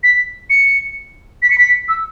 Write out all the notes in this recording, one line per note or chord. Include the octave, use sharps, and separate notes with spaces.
B6
C#7
B6
C#7
B6
E6